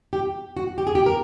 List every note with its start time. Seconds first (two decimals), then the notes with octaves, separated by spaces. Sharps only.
0.13 G4
0.57 F#4
0.78 G4
0.87 G#4
0.95 G4
1.06 A#4